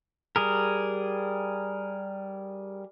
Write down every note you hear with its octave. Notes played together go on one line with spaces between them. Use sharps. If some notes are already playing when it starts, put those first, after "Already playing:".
G3 G#4 A#4